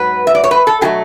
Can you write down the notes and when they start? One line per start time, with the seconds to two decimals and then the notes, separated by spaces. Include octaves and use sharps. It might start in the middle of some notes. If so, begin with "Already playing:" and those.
Already playing: G#2 F#3 B3 B4
0.27 E5
0.35 D5
0.44 C#5
0.51 B4
0.67 A4
0.81 B2 F#3 A3 G#4